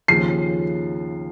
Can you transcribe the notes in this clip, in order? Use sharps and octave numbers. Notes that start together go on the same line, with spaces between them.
D#2 C#3 F3 C7